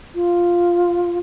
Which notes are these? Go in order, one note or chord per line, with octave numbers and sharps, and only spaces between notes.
F4